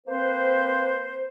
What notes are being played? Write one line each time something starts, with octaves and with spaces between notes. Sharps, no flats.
A#3 C4 B4 C5